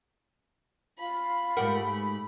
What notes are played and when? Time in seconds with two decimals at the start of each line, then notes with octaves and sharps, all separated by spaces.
0.99 F4 F5 B5
1.57 G#2 A3 G4 A#4 F#5